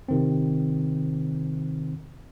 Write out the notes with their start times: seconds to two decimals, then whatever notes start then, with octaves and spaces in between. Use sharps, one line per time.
0.08 C3 D#3 C4